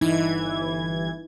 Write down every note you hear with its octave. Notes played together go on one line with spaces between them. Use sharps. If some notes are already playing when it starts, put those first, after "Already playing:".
G1 E3 D#4 E4 G#6